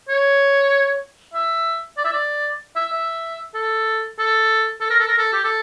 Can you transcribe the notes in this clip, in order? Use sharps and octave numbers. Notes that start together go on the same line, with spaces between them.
C#5
E5
D5
E5
D5
E5
E5
A4
A4
A4
A#4
A4
A#4
A4
G4
A4